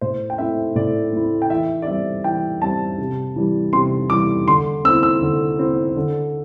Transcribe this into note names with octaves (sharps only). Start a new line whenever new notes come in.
A2 C5
G5
A3 C4 E4 E5
A2 D5
A3 C4 E4
G5
E3 E5
D5
G3 C4 E5
E3 G5
G3 C4 A5
C3
E3 G3
C3 C6
E3 G3 D6
D3 C6
C4 E4 E6
E6
D3
C4 E4
D3